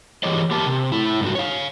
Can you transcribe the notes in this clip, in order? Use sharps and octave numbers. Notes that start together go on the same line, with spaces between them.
E3 F#3 G4 G#4 C#5 D#5
A#3 G4 A#4 E5 A5
C3
A3 E4
G#2 G3 C#4 D#4 F#4
C#5 F5